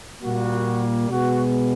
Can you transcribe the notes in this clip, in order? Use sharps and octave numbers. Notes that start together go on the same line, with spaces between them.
A#2 G3 A#3 F#4
B2 G#3 B3 F#4